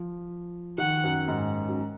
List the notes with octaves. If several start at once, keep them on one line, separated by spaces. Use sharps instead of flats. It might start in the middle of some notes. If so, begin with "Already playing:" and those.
Already playing: F3
D#3 F#5
F#2
G#2
F#2